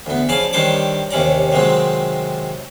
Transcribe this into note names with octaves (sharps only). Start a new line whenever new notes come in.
D2 B3
C#3 F3 D5 F5 G#5 A5
D#3 G3 D4 C5 C#5 D6
D#2 C3 C#4 D5 A#5
C3 D#3 F#3 G#3 C4